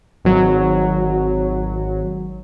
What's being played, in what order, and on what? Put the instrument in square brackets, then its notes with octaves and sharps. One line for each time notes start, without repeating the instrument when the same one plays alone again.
[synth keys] G#1 F#3